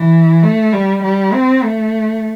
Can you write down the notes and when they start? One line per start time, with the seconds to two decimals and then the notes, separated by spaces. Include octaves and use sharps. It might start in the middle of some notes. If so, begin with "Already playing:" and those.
Already playing: E3
0.43 A3
0.73 G3
1.03 G3
1.33 C4
1.64 A3